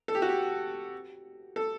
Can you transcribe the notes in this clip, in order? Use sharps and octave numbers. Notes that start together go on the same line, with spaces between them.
A4
G4
F#4
G4
A4